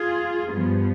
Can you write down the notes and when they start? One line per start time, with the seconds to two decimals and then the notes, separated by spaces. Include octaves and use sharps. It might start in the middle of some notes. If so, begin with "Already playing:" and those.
Already playing: F4 G#4
0.51 G2 F3 B3